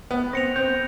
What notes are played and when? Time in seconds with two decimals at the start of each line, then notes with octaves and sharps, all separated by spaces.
0.11 B3 F#6
0.33 C4 A#6 C#7 F7
0.56 C4 G6